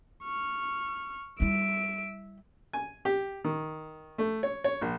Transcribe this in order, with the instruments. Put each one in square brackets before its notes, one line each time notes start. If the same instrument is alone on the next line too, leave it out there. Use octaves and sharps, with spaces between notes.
[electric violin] C#6 F6
[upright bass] G3 E4 [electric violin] E5 D7
[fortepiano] G#5
G4
D#3
A3
C#5
C#5
A#1